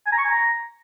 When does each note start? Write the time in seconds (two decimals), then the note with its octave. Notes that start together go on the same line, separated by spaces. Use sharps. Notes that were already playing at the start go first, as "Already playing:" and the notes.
0.06 G#5
0.12 A#5
0.18 C#6
0.24 G#5
0.30 A#5